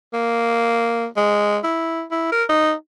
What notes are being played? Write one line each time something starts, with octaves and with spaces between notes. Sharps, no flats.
A#3
G#3
E4
E4
A#4
D#4